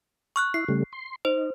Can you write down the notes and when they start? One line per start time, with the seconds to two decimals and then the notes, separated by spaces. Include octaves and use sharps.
0.36 C#6 F6 F#6
0.54 E4 C7
0.68 C#3 G3 A3
0.93 C6
1.25 D#4 C5